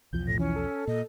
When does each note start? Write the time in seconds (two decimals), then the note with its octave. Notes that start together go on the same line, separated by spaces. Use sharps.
0.13 B1 E2 F3 G6
0.28 A2 A#6
0.39 E3 C#4
0.56 A4
0.87 A#2 D#5